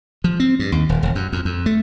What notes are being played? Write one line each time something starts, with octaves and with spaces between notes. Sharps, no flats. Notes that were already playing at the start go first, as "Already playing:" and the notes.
F3
C4
G2
D#2
D#1
E1
F#2
F2
F2
A3